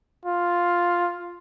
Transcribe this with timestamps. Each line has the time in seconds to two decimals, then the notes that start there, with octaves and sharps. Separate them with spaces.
0.25 F4